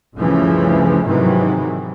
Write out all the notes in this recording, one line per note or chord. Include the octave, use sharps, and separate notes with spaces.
G1 D2 C#3 E3 F3 A3
G#2 C3 D#3 E3 F#3